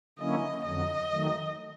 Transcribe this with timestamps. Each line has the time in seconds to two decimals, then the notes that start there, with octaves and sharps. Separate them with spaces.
0.19 D3 F#3 A#3 C#4 E4 D#5
0.65 F2 D3 F#3 D#5
1.11 D#3 F#3 A3